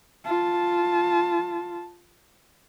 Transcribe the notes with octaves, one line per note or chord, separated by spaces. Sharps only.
F4 A5